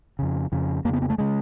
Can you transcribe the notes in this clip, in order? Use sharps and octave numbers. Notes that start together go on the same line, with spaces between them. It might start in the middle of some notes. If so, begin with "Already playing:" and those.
F2 C#3
F2 C#3
F2 C#3 A#3 B3
B3
A3
C#3 G#3